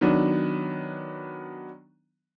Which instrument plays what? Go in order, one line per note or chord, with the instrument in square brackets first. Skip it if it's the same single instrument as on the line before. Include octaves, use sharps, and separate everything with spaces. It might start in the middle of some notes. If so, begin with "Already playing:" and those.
[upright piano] D#3 F#3 B3 D4